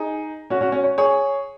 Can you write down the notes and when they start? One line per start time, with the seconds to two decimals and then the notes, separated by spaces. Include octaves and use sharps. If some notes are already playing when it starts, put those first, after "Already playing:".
Already playing: D#4 G#4
0.50 C#4 F#4
0.61 C#4 F#4
0.72 C#4
0.84 C#5
0.98 G#4 C#5